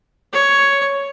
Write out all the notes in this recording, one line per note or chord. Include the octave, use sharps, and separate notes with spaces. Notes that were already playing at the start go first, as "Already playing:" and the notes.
C#5